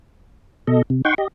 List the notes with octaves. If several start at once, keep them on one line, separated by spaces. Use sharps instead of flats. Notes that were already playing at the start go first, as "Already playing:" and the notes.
B2 A4 D#5
C3
D#4 F#5 G5 C6 C#6
G4 D#5